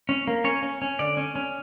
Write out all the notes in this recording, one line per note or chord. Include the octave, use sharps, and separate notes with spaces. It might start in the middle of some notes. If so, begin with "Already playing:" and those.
C#4
A#3
C#4 C#5
C#4
C#4
D3 D5
C#4
C#4